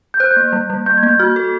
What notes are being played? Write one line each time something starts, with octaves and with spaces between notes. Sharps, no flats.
G6
C5 F#6
G6
A#3
G3
G3
A#3 G6
G#6
A#3
G6
F#4 F6
A4